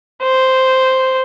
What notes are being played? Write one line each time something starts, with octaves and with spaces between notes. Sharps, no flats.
C5